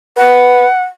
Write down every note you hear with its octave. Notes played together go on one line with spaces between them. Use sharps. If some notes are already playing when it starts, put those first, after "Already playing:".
B4 F#5